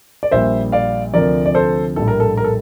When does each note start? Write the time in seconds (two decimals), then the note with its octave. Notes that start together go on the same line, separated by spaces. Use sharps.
0.23 D5
0.31 A#1 A#2 G3 C5 E5
0.72 D5 F5
1.14 D2 C3 F3 A#4 D5
1.46 D5
1.55 A4 C5
1.96 A#1 A2 G3 A4
2.08 A#4
2.20 A4
2.37 A#4
2.44 A4